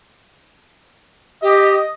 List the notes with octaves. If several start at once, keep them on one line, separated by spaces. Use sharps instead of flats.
G4 D#5